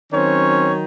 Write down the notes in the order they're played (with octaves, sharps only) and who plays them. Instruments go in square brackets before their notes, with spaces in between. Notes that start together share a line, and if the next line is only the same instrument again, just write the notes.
[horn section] D#3 F#3 C4 C#4 C#5